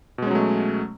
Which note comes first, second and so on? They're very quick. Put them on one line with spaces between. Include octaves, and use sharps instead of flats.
B2 G#3 C#4 F#3 A3